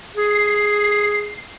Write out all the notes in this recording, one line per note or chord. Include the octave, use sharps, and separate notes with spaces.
G#4 C7